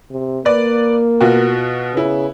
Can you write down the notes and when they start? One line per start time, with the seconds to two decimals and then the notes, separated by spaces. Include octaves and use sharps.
0.11 C3
0.45 A#3 B4 D5
1.21 B2 F4 F#4
1.94 C#3 B3 E4